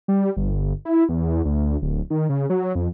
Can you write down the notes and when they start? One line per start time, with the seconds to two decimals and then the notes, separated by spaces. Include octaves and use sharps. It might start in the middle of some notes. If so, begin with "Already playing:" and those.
0.08 G3
0.37 G1
0.85 E4
1.09 E2
1.45 D2
1.82 D1
2.10 D#3
2.29 C#3
2.50 F#3
2.75 F2